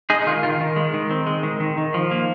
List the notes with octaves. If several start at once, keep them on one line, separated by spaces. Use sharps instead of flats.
G#3 D#4 G#4
D#4
D#3 F4
D#3 F4
D#3
G#3
D#3
C4
G#3
D#3
D#3
D#3
F3
A#3